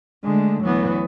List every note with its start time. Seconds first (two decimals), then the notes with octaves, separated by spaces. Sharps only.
0.24 D3 G#3 A3
0.64 D2 E3 F#3 B3